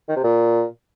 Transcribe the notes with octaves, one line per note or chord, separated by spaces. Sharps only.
D#3
C3
A#2